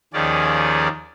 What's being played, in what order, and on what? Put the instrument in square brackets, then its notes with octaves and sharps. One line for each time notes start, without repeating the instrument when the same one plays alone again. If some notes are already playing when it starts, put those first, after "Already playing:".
[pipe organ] D#2 D#3 F3 C#4 G#4 D5